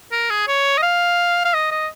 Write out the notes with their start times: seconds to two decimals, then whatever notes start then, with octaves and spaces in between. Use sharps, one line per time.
0.12 A#4
0.30 G#4
0.48 C#5
0.78 D#5
0.83 F5
1.45 F5
1.54 D#5
1.72 D#5